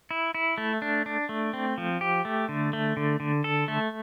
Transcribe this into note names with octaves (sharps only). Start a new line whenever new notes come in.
E4
E4
A3
D4
D4
A3
C4
F3
G4
A3
D3
A3
D3
D3
A4
A3